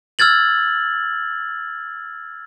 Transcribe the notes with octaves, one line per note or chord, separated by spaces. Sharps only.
E6 F6 G#6 A6 F#7